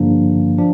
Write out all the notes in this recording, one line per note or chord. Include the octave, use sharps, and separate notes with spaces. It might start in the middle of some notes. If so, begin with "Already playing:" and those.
Already playing: G2 D3 F3 A#3 D4
F3 D4